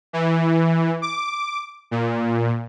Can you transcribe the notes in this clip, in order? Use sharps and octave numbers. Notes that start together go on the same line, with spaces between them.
E3
D6
A#2